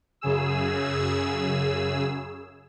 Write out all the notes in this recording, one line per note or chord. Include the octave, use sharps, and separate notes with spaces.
F#2 C#3 G#4 E6